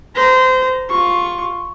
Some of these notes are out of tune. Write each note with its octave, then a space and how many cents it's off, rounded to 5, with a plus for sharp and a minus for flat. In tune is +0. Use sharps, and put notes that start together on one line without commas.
C5 -25 A#5 +0
F4 +10 C#6 +0